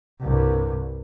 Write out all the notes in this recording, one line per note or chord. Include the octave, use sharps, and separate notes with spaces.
C2 G2